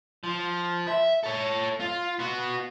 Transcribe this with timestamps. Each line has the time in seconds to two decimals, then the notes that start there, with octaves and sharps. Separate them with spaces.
0.24 F3
0.87 E5
1.23 A4 C#5
1.80 F4
2.19 B3 F#4